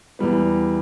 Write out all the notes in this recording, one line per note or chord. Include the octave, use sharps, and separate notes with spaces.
E2 E3 G3 B3